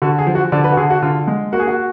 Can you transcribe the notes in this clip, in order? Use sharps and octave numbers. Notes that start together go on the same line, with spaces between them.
D3 F#4
G#4
F3
F#4
D3 D5
B4
F#4
D3 G#4
F#4
D3 F4
G#3
A#3 F#4
G#4
F#4